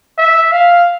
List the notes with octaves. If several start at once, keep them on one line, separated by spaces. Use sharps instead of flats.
E5
F5